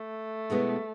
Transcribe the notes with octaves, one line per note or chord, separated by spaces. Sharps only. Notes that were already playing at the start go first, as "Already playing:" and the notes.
Already playing: A3
B2 G#3 B3 E4